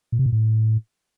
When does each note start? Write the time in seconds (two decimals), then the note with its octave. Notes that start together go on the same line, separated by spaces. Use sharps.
0.12 A#2
0.19 C3
0.26 A#2
0.32 A2